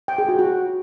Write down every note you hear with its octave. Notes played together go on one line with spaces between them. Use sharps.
G5
G#4
F#4
F#4